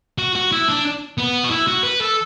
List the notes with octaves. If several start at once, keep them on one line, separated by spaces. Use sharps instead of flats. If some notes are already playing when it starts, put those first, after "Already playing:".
F#4
F#4
E4
D4
B3
F#4
E4
F#4
B4
A4